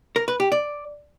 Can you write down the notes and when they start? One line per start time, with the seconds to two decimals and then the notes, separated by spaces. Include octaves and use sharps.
0.16 A#4
0.28 B4
0.40 G4
0.52 D5